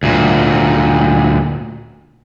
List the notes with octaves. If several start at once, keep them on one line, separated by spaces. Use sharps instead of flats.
D2 A#2